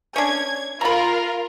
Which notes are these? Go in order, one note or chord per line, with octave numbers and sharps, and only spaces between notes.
C#4 D4 G#6
F4 A#4 A#5 B5